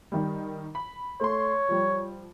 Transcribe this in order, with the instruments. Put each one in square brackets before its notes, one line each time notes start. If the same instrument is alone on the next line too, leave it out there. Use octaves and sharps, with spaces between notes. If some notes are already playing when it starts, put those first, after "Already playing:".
[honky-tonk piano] D#3 G3
B5
[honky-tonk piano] A3 C6 [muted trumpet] C#5
[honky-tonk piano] F3 G3